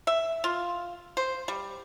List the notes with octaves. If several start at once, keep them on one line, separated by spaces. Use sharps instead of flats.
E5
F4
C5
G3